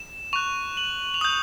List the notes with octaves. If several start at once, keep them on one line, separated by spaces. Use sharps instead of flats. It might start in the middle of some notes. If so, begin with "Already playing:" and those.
Already playing: E7
C#6 F#6 F7
F#7
F7
D#6 G6 F#7